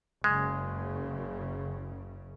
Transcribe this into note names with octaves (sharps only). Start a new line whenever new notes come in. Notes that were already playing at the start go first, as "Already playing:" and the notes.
F#1 F#2 C#3 G#3